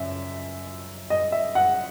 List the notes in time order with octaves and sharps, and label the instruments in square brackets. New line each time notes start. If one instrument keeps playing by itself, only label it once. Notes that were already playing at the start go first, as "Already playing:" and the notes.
Already playing: [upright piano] F#2 C#3 E5
D#5
E5
F#5